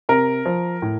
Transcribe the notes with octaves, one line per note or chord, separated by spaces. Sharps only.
C3 A#4
F3
A2